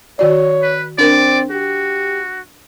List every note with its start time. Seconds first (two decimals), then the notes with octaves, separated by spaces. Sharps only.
0.19 D#3 F#4 C#5 D5
0.62 B4
0.98 C4 D4 A#4 D5
1.51 F#4 G4